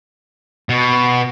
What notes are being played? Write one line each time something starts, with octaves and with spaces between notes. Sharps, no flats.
B2